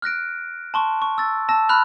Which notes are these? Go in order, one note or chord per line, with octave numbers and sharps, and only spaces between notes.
F6 F#6 A#6 D7
A5 C6 C#6
C#6
E6 A6
A5 E6 A#6
B5 F6 F#6 F7